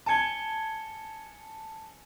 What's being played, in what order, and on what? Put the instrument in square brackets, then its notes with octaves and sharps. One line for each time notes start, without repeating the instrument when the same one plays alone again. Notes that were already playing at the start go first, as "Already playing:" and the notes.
[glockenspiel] G#5 C#7 G7 [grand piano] A5 G#6